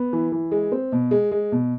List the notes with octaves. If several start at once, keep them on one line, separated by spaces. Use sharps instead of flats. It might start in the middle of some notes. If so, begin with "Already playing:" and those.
Already playing: B3
E3
E3
G#3
C4
B2
G#3
G#3
B2